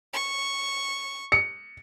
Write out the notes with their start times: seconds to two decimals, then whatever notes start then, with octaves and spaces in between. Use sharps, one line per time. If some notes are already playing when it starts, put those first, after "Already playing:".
0.13 C#6
1.32 C#7